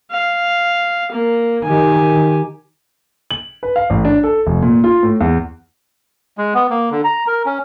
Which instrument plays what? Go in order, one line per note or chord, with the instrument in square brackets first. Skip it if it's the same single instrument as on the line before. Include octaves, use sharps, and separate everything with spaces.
[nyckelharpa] F5
A#3
[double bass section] D#3 [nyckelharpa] G4 G#5
[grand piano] F#7
B4
F5
A1
D4
A4
F1
A#2
F4
A2
E2
[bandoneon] G#3
B3
A#3
D3
A#5
A#4
C#4